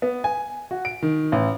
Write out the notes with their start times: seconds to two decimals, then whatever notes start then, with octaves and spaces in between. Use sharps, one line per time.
0.02 B3
0.24 G#5
0.71 F#4
0.85 D7
1.02 D#3
1.32 A1